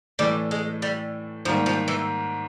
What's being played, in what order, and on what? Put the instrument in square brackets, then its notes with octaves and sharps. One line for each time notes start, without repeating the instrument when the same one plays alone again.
[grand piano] A2 E3 A3 [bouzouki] G3
[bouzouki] G#3
G3
[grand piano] G#2 D#3 G3 A#3 [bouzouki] F3
[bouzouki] F3
E3